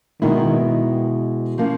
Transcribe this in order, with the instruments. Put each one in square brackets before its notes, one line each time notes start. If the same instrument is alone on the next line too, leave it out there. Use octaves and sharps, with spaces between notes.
[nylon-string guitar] B2 G#3 B3 E4 G#4 [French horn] D#3
[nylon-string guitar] F3 A#3 C#4